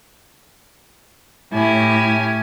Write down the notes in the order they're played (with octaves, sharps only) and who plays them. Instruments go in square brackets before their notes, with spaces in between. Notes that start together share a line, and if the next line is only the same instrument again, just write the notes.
[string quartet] A2 E4 [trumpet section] C#4 G4 G#5